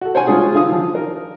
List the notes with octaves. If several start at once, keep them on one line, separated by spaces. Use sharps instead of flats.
F#4 A4
C5 C#5 F#5 G#5
G#3 C#4 F4 G#4
D3 G#4 F5 D#6
D#3 F3
A#4